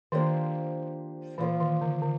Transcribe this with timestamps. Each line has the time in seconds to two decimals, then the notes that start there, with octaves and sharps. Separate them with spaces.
0.12 D#3 F3 A#3 D4 G4 C5
1.38 A#2 E3 F3 A#3
1.60 D#3
1.81 D3
2.02 D3